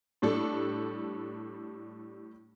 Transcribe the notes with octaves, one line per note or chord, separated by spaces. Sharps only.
A2 G3 D4 A4